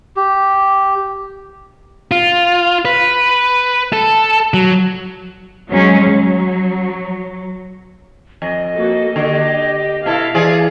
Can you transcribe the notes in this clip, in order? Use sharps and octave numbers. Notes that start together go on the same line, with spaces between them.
G4
F4
B4
A4
F#3
F#3 G#3 C#4
F#3
F2 D#5
A#3 F#4 A4
D3 G4
B2 E4 A4 F5
E3 G#4 D5